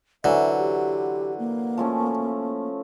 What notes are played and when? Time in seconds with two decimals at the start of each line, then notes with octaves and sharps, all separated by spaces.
0.24 D3 E3 F#3 C5 E5
0.59 G4
1.39 A#3
1.77 F3 A3 C#4